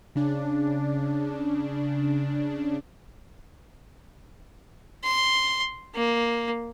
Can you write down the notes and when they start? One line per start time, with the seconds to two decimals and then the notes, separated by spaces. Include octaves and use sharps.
0.15 C#3 D4
5.04 C6
5.95 A#3